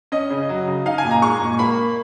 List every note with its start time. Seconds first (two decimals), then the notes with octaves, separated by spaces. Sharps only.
0.12 C#4 D#5
0.30 C#3
0.49 F#3
0.67 C#3
0.86 D#4 F5
0.98 G#5
1.05 A#2
1.11 A#5
1.22 G#3 C#6
1.41 A#2
1.59 A#3 B5